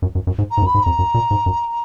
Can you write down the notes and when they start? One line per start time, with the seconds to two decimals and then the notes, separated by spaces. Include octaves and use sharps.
0.02 F#2
0.15 F#2
0.27 F#2
0.38 G#2
0.51 A#5
0.57 G#2
0.62 F#2
0.66 B5
0.74 G#2
0.83 F2 A#5
0.99 F#2
1.14 A#2
1.31 G#2
1.46 F#2